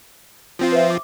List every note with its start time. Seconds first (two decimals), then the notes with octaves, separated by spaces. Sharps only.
0.59 F3 C4 F4
0.72 B4 C5 E5
0.90 D6